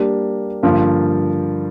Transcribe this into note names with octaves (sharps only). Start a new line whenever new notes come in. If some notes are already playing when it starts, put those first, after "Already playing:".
Already playing: G3 A#3 D4 G4
G2 D3 F3 A#3 F4